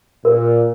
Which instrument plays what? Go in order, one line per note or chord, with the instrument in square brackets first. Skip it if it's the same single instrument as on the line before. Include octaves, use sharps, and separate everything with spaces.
[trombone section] A#2 [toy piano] A#4